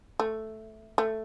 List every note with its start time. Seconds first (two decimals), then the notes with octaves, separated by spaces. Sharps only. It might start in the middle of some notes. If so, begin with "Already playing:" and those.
0.20 A3
0.98 A3